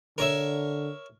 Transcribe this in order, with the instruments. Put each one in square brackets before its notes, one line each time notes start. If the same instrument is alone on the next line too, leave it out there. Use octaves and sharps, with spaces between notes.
[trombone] D3 [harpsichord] A#4 C#5 E5